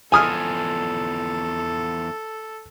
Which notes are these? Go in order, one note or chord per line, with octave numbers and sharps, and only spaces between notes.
E2 F3 A4 G#5 D#6 F6